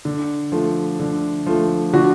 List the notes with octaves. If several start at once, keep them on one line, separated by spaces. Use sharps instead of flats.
D3
F3 A3
D3
F3 A3
D3 F#4